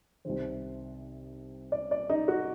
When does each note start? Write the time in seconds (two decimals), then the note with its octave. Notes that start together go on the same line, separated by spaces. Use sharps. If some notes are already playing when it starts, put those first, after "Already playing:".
0.25 C2 C3 D#3 C5
1.72 D5
1.91 D5
2.10 D#4
2.28 F#4